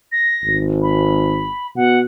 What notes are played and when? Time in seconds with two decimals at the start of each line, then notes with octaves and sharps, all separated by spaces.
0.12 A#6
0.44 G#1
0.82 B5
1.76 B2 F#5